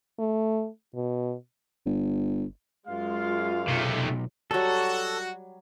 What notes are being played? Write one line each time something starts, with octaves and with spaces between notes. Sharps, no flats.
A3
B2
G1
F#2 G#3 F4 F5
B1 C3 A3
F#3 G3 F#4 A4